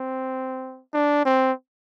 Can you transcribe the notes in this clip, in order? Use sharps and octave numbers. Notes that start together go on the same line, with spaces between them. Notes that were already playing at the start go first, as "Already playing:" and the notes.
Already playing: C4
D4
C4